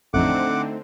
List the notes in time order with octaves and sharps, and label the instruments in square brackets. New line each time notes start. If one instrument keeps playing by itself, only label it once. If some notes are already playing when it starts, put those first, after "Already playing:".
[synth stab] A1 F2 [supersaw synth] D3 C4 [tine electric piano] A3 D#4 [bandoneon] F#5 D6